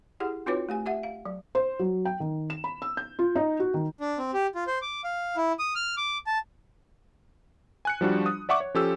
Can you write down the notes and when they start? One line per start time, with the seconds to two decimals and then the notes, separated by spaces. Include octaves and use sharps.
0.20 E4 G4 G#4 F#5
0.46 C4 D#4 F4 F#4 B4 C#5
0.69 A3 G4 G#5
0.86 G4 E5 F#5
1.03 F5
1.25 F#3
1.55 C5
1.79 F#3
2.05 G5
2.20 D#3
2.50 E7
2.64 B5
2.82 E6
2.97 G6
3.19 F4
3.36 D#4
3.60 F#4
3.74 D#3
4.01 D4
4.18 C4
4.33 G4
4.55 F4
4.67 C5
4.82 D6
5.04 F5
5.37 E4
5.59 D#6
5.75 F6
5.97 D6
6.27 A5
7.85 G#5 F#6 C#7
8.01 F3 G3 D4 F#4
8.26 D#6
8.49 D5 E5 F#5 C#6 D6
8.60 C#5
8.74 F3 C#4 G4 A4 E6